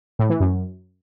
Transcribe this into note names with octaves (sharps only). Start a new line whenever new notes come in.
A2
E3
F#2